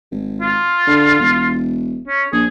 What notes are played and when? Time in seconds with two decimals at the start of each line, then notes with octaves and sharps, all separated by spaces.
0.12 G#1
0.41 F4
0.87 D3
1.20 E1
2.08 C#4
2.32 A#1 G#4